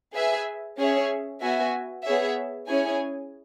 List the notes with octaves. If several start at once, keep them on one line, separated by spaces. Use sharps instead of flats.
G#4 B4 E5 G#5
C#4 G#4 C#5 E5
B3 F#4 E5 G#5
B3 G#4 C#5 E5
C#4 E4 G#4 C#5 G#5